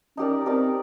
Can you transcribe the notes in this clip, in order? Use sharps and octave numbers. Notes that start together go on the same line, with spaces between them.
C#4 D#4 G4 A#4 D5
C4 D#4 G4 A#4 D5